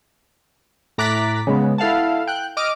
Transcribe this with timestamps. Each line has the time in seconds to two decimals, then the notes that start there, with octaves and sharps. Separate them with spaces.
0.98 A2 A#5 D6 F#6 A6 B6
1.47 C#3 G#3 B3
1.78 E4 A4 F5 F#5 A5
2.27 G5 F#6
2.57 D#5 D6 F6